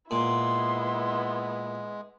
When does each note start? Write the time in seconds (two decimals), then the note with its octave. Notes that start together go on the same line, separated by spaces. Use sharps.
0.11 A#2 G#3 B3 E4 C6